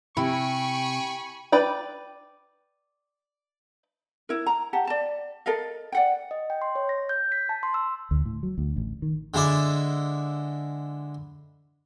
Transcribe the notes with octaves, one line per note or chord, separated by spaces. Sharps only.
C3 E4 G5 G#5 B5 C#6
B4 D5 G5
E4 A#4
A#5
G4 F#5 A5
D5 A5
A4 A#4 D#5 F5
D5 F#5 G5
D#5
G5
C6
C#5
A#6
G6
B6
A5
C6
E6
D2
A2
F#3
D2
A1
D#3
D3 G#3 E4 D5